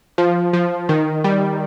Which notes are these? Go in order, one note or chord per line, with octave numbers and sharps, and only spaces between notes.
F3
F3
D#3
G3